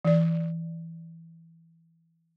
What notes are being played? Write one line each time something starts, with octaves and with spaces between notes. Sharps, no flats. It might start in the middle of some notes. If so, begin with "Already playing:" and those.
E3 D5